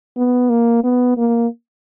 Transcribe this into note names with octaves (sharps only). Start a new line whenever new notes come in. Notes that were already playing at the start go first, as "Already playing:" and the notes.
B3
A#3
B3
A#3